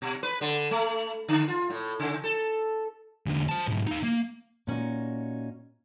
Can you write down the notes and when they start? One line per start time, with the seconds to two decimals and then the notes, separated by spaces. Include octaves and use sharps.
0.02 B2
0.23 B4
0.41 D3
0.71 A3
1.28 D3
1.48 F4
1.70 A2
2.00 C#3
2.24 A4
3.26 E2 D3
3.49 C5 A5
3.68 B1 G#2
3.87 D#4 F5
4.03 A#3
4.67 A#2 C#4 D#4 F#4